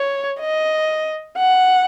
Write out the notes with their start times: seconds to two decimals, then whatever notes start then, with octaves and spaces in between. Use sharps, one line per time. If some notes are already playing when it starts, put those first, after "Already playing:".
Already playing: C#5
0.40 D#5
1.37 F#5